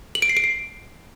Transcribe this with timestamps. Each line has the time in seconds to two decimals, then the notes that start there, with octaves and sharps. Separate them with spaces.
0.15 F#7
0.22 D7
0.29 C7
0.37 D7
0.44 C7